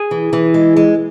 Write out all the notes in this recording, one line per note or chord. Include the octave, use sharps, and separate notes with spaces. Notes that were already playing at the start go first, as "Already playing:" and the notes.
Already playing: G#4
E3
E3
G#3
G#3